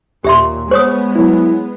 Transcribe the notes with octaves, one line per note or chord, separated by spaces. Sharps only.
D#2 A#2 G4 E5 C6
G#3 B3 C5 C#5 C#6 D#6
F#3 E4